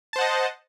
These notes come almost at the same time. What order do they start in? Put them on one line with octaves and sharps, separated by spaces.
A5 C5 F#5 D#5